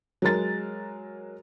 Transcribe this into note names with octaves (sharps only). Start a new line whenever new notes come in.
F#3 G#3 A#4 A6